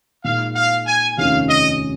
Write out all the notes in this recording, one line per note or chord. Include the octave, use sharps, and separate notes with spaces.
A#2 G#3 D#4 F5
F5
G#5
F1 D#2 D#3 C#4 F4 F5
D#5